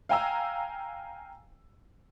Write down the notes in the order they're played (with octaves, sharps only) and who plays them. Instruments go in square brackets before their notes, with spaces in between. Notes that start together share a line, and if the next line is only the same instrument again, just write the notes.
[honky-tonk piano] F5 G5 G#5 A#5 E6